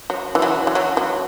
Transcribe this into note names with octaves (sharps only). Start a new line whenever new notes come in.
F#3
E3
F#3
E3
F#3
F#3